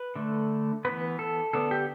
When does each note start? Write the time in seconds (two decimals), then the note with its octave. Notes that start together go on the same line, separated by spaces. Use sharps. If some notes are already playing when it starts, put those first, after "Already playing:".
Already playing: B4
0.16 D3 A3
0.85 E3 B3 B4
1.19 A4
1.53 D3 B3 A4
1.71 G4